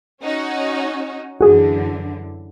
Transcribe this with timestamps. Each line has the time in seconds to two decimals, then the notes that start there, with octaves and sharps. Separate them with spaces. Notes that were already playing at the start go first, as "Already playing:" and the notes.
0.22 C#4 D#4 F#4
1.41 F#2 D3 E3 F#4 G#4